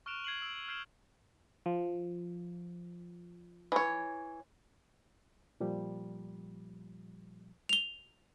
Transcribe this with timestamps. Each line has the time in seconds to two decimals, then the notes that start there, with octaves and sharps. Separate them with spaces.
0.06 C#6 F6 F#6 D7 E7 F7
0.24 G#6 C7 D7 F#7
0.42 E6 D7
0.68 F6 G6 G#6 C7 D7 E7
1.66 F3
3.72 E3 C#5
5.60 A#2 F3 G3
7.69 F7 G7